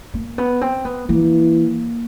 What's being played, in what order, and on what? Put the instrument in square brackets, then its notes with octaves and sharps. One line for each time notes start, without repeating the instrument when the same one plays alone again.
[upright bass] A#3
B3
C4
B3
[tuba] E3 [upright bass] A#3